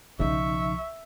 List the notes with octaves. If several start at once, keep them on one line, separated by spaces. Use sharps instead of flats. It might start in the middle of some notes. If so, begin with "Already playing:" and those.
B1 C#3 F3 D#4 E5 C#6